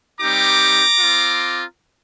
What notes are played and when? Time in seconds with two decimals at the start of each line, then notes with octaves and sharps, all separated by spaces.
0.21 G3 C4 D#4 G4 A#5 D6
1.00 C4 F4